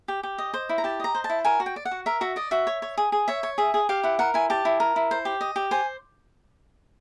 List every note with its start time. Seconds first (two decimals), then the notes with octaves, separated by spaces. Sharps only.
0.08 G4
0.23 G4
0.38 D#5
0.54 C5
0.69 E4
0.78 A#5
0.84 G4 A5
1.00 D#5 A#5
1.15 C5
1.24 A5
1.30 E4
1.45 A#4 G#5
1.60 F#4
1.66 G5
1.76 D5
1.85 F#5
1.91 F#4
2.06 A#4 E5
2.21 F#4 E5
2.36 D5 D#5
2.51 F#4 E5
2.67 C#5
2.82 C#5
2.97 G#4
3.12 G#4
3.28 C#5 E5
3.43 C#5
3.58 G#4 E5
3.74 G#4
3.89 G4 F5
4.03 E4 F#5
4.19 A#4 F#5
4.34 E4 G#5
4.50 G4 A5
4.65 E4
4.80 A#4
4.96 E4
5.11 C5
5.25 G4
5.41 D#5
5.56 G4
5.71 C5 G#5